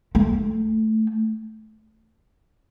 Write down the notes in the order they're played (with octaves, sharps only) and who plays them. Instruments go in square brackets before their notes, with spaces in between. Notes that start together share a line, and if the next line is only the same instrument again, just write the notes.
[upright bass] A3